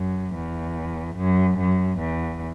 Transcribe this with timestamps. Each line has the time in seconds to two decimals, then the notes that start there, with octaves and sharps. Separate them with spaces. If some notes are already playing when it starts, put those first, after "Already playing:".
Already playing: F#2
0.35 E2
1.17 F#2
1.58 F#2
1.99 E2